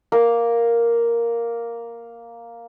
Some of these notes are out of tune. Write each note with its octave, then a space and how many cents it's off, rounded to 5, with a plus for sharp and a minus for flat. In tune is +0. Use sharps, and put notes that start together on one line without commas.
A#3 +0 A#4 +0